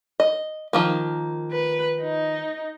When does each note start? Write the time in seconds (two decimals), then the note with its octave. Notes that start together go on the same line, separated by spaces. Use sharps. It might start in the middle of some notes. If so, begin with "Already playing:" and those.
0.20 D#5
0.73 D#3 F3 A#3
1.52 B4
2.02 D#4